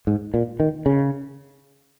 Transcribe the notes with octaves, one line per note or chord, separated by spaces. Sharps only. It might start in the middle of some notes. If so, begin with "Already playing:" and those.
G#2
A#2
D#3
C#3